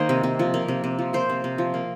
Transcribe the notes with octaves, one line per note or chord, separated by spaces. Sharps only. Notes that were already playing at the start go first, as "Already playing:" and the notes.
Already playing: D#3 A#3 C5 D#5
C3
C3
F3
A#3
C3
C3
F3
A#3 C5
C3
C3
F3
A#3